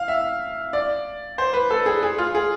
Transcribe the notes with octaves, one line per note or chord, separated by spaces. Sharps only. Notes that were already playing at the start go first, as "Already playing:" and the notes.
Already playing: F5
E5
D5
C5
B4
A4
G#4
G#4
F4
G#4